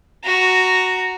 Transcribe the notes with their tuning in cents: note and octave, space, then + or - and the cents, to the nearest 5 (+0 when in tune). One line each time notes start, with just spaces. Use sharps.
F#4 +0 A#5 -5